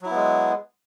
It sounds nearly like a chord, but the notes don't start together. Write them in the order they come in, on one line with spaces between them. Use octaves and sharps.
F#3 E4 B3 G#3